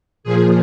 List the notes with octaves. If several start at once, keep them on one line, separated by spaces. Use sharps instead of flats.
A#2 F3 G#4